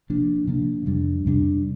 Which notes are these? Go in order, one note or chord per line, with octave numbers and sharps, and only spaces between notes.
C3 F3 A#3 D4
C3 F3 A#3 D4
F2 C3 G3 D4
F2 C3 G3 D4